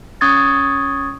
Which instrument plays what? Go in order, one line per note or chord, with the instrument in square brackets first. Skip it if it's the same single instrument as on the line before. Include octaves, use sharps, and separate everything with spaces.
[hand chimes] C#4 C#6 D#6 G#6 A6